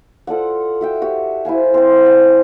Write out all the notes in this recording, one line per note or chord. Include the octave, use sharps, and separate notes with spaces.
F4 A4 D5 F#5
F#4 E5 G5
F#4 G4
E4 C5 F5 G#5
C4 C5
D5 F#5 G#5